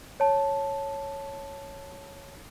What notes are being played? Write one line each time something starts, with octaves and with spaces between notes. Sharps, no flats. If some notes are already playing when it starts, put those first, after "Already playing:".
C#5 A5